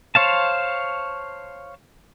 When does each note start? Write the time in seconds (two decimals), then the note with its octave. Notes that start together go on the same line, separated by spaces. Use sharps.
0.15 C5 C#5 F5 A5